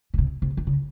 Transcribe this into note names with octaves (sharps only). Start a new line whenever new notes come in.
C#3
C3
C3
D#3
C#3